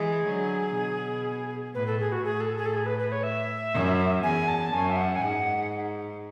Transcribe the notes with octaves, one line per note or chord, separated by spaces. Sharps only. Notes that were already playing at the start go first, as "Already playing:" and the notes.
Already playing: E3 G#3 G#4
D3 F#3
B2
A2 B4
A4
G#4
F#4
A2 G#4
A4
G#4
A4
G#4
B4
B4
C#5
E5
F#2
E2 G#5
A5
F#2 G#5
E5
F#5
G#5
G#2 F#5